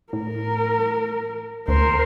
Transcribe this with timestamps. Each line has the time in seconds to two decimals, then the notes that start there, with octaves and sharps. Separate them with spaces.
0.13 A2 A#4
1.68 D2 A#4 C5